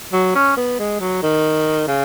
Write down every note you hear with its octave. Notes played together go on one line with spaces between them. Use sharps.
F#3
C#4
B3
G#3
F#3
D#3
C#3